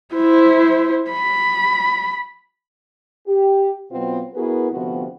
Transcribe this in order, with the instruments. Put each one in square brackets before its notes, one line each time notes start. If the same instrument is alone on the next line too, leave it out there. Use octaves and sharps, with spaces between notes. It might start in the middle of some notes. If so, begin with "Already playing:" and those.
[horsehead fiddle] E4 C5
B5
[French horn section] G4
B2 F#3 B3 C4 F4 F#4
B3 E4 F#4 G#4 A#4 B4
D2 C3 F3 B3 C4 F#4